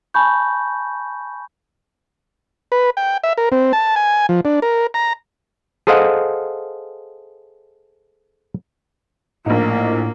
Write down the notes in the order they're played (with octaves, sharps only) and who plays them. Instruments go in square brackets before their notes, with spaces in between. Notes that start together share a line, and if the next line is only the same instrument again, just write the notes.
[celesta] G#5 A5 B5 C#6 G6
[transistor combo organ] B4
G5
E5
A#4
C4
A5
G#5
F3
D4
A#4
A#5
[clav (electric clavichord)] G#4 A4 C5 D#5 F5 F#5
[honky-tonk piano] A#1 D#4 [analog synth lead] A2 [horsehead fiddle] A#3